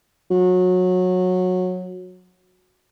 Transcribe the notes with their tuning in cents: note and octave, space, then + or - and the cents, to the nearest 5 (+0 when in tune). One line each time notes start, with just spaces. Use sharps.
F#3 -20